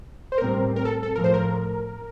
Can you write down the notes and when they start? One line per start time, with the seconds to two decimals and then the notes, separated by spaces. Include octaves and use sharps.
0.32 C5
0.38 A2 G3 C4 A#4
0.76 A#4
0.85 A4
1.03 A4
1.15 A2 F3 A3 A#4
1.24 C5
1.34 A#4